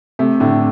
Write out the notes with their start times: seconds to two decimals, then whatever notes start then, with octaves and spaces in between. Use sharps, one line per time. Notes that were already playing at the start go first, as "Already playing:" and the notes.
0.19 C3 A3
0.40 A2 D3